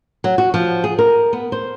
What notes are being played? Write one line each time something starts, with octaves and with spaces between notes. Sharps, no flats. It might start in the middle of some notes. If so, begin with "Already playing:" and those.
F#3
F#4
F3
G#4
A#4
B3
C5